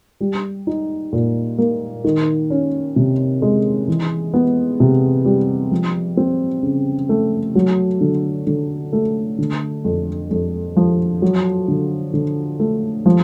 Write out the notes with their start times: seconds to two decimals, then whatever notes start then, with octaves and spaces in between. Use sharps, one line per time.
0.21 G3
0.67 D#4
1.13 A#2
1.58 A#3
2.04 D#3
2.50 C#4
2.96 C3
3.42 G#3
3.88 E3
4.34 B3
4.80 C3
5.25 G3
5.71 F3
6.17 C4
6.63 C#3
7.09 A3
7.55 F#3
8.01 D3
8.47 D3
8.93 A3
9.38 D3
9.85 F2
10.31 F2
10.76 F3
11.22 F#3
11.68 D3
12.14 D3
12.59 A3
13.06 F3